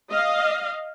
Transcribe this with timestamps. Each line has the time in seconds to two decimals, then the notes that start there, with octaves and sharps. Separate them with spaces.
0.10 D#5 F5